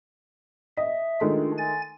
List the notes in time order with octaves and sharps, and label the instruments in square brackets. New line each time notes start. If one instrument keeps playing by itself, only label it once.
[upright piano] D#5 [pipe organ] E5
[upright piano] D#3 G#3 A3 [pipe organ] D4 F4
[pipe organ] G#5 A6